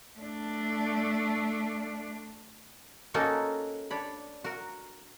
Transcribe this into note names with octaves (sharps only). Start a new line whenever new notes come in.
A3 D4
A#3 C#4 D#4 F#4 A4 A#4
D4 C#5 B5
F#4 A#4